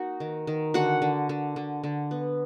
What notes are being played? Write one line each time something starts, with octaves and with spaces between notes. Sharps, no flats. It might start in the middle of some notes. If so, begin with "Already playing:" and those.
Already playing: A#3 D#4 F#4 F#5
D#3
D#3
D3 F#4 F#5
D3
D3
D3
D3
B3